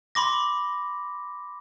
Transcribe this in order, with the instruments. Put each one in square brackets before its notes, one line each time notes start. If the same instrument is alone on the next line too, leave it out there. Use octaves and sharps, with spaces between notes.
[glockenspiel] B5 C6 D6 A#6